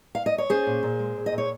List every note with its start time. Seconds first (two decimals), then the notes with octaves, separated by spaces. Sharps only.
0.15 F5
0.26 D#5
0.38 C#5
0.50 C#4 G#4 C5
0.66 A#2
0.83 A#2
0.99 G#3
1.16 A#2
1.26 D#5
1.32 A#2
1.38 C#5